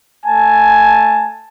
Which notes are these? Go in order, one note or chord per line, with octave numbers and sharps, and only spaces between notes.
A3 G#5 A5